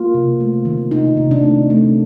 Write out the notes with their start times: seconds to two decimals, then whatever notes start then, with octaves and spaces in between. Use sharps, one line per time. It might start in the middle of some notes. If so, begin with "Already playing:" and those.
Already playing: A#3 F4
0.14 C3
0.40 A3
0.65 D#3
0.91 C3 D#4
1.17 C3
1.31 D4
1.43 A3
1.70 A3